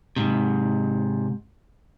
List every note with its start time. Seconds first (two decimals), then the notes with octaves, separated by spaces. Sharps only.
0.16 G#2 C3